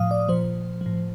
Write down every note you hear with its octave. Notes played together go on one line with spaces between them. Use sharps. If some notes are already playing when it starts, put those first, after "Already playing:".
Already playing: A2 F3 F5 D#6
D5
A#2 F3 C5
F3
A2